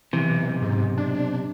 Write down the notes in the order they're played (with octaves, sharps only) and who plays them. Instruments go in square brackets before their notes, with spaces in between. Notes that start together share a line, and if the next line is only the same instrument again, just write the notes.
[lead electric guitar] B1 C3 [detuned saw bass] E3
[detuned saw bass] G#2
D4